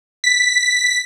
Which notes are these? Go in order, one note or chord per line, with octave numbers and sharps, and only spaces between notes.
B6